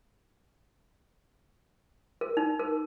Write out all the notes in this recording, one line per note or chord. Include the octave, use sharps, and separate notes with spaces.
A#4
D#4
A#4